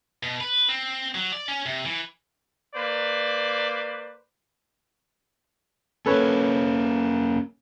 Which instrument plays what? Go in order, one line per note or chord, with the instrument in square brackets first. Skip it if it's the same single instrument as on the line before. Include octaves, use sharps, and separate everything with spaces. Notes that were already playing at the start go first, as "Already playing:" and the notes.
[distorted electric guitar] B2
B4
C4
F#3
D5
C#4
C3
E3
[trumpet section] A#3 B4 C5 D5
[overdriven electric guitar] A#3 C#4 [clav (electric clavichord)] A4 B4 C#5